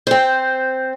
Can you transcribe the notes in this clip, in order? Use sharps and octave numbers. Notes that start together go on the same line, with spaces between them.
C4 C5